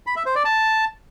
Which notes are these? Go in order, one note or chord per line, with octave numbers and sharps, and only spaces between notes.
B5
E5
C5
D5
A5